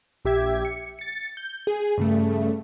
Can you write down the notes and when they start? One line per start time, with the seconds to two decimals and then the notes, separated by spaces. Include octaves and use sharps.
0.25 A#1 G4 E5 G#6
0.65 C#7
0.99 A6 C#7
1.37 G6
1.67 G#4
1.98 G2 C#3 A3